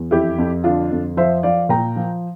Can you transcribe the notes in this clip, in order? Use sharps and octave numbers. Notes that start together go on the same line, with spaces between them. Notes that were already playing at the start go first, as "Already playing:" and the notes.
Already playing: E2
F2 E4 G4
F2
D3 D4 F4
F2
F3 C5 E5
F3 D5 F5
A#2 G5 A#5
F3